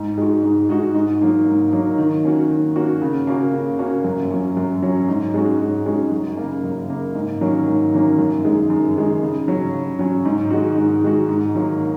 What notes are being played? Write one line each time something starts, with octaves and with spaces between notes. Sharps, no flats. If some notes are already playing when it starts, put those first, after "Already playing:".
Already playing: G#2
G#3 D#4 F#4
G#2
G#3 D#4 F#4
G#2
F#3 A#3 D#4
G#2
F#3 A#3 D#4
D#3
A#3 C#4 F#4
D#3
A#3 C#4 F#4
C#3
A#3 C#4 F#4
C#3
A#3 C#4 F#4
F#2
F#3 C#4
F#2
F#3 C#4
G#2
G#3 C#4 F#4
G#2
G#3 C#4 F#4
F#2
C#3 A#3
F#2
C#3 A#3
G#2
D#3 F#3 A#3 C#4
G#2
D#3 F#3 A#3 C#4
F#2
D#3 G#3 D#4
F#2
D#3 G#3 D#4
C#3
F#3 C#4
C#3
F#3 C#4
G#2
D#3 G#3 D#4 F#4
G#2
D#3 G#3 D#4 F#4
G#2
D#3 F#3 A#3